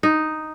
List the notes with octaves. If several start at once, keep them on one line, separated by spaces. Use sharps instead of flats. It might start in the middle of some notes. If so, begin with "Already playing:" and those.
D#4